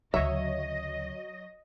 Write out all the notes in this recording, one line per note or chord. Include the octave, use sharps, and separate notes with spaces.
D2 C#3 F#3 C#5 D#5 E5